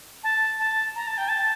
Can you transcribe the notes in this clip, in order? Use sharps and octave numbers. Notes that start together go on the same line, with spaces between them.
A5
A5
A#5
A5
G5
A5